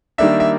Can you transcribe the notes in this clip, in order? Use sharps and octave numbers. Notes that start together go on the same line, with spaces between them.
D#3 G3 A#3 D4 E5
E5